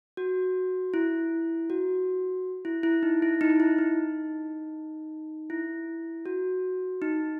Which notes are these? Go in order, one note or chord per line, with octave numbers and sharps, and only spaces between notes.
F#4
E4
F#4
E4
E4
D#4
E4
D#4
E4
D#4
E4
F#4
D#4